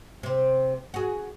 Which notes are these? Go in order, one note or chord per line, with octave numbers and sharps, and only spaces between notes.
C3 C4
F#4 G#4